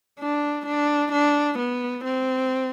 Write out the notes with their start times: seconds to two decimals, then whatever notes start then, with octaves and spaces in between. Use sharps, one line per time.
0.20 D4
0.66 D4
1.12 D4
1.58 B3
2.05 C4